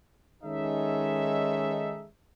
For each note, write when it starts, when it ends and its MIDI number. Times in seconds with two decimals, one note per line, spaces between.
0.44 2.06 51
0.44 2.06 56
0.44 2.06 61
0.44 2.06 63
0.44 2.06 69
0.44 2.06 76